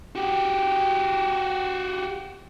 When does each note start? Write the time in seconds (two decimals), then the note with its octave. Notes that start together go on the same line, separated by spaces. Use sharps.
0.15 F#4 G4